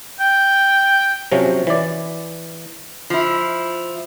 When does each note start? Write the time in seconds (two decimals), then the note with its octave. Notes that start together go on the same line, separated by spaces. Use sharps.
0.20 G5
1.32 C3 F3 F#3 C#4
1.67 E3 D5
3.10 F3 E4